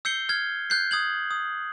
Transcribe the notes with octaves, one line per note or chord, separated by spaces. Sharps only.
E6 G6 C7 C#7 G7
F6 G#6
F#6 G6 C7
D#6 G#6 F#7
D#6